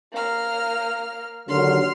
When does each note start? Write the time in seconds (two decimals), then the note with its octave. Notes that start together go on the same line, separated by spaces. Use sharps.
0.13 A#3 F6
1.48 D#2 D3 F#3 C6 F6